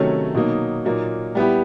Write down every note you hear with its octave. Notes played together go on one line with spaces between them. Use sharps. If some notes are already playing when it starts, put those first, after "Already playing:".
Already playing: C3 D#3 F#3 A3 C#4
B2 F#3 A#3 D#4
A#2 F#3 A#3 D#4
G3 B3 E4 G4